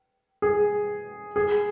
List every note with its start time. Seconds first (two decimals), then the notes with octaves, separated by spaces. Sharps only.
0.42 G#4
1.36 G#4